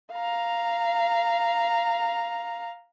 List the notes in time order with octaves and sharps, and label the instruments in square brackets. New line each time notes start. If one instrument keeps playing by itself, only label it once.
[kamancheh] F5 A#5